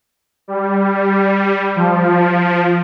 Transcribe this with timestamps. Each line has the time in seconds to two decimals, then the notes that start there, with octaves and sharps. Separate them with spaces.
0.48 G3
1.76 F3